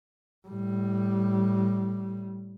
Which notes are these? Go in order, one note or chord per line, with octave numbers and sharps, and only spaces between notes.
A2 G3